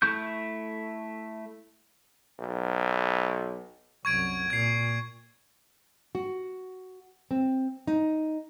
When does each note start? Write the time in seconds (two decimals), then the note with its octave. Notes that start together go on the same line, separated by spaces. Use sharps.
0.02 A3 E4 C#6 G6
2.40 B1
4.05 C2 F#2 C#6 G#6 D7
4.50 A#2 G#6 C7
6.15 F#4
7.31 C4
7.87 D#4